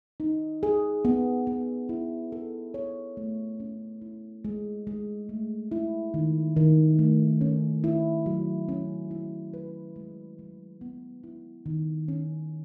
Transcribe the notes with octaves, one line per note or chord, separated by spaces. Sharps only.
D#4
G#4
B3
B3
E4
A4
C#5
A3
C#4
E4
G#3
G#3
A3
E4
D#3
D#3
A3
C#4
E4
F#3
C#4
E4
B4
G#3
F#3
B3
E4
D#3
C#4